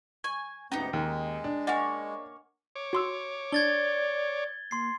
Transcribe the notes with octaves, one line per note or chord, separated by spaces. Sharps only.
G#5 C#6
D2 G#2 B3 C#4 D#4 G4 A#5
D#2 G#3
D4
A#3 C#5 D#5 F#5 G#5
C#5 D6
F#4 C6 E6
D4 D5 G#6 A6 G7
A#3 C6 C7